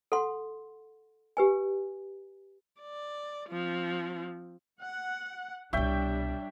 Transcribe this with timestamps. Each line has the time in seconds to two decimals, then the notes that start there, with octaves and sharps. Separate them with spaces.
0.12 A4 F#5 C6
1.37 G4 B4 G#5
2.81 D5
3.49 F3 C4
4.81 F#5
5.73 C2 B2 G3 D4 C#5 E5 G5